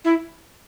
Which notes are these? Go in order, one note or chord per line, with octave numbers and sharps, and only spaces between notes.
E4